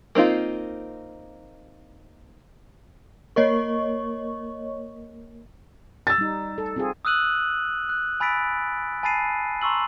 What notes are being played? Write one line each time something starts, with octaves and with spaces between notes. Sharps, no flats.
A#3 C4 D#4 F4
A#3 A#4 C#5 D#5 C#6
E6 A6
G3 D#4
A4
C4 F4 G#4
D#6 E6 F#6 D#7 F#7
F#6
G#5 B5 E6 A6 B6 D7
G#5 A5 B5 A6 C7 D#7
A#5 C6 C#6 E6 F#7